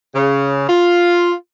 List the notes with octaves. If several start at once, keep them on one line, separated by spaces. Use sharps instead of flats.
C#3
F4